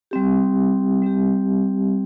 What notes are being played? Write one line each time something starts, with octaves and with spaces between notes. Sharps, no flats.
G3 C4 G4
G3 C4 G4